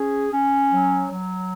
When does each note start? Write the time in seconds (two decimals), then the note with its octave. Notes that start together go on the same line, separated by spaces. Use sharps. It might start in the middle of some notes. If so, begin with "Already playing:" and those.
Already playing: C#4 G#4
0.31 C#4
0.71 F#3
1.09 F#3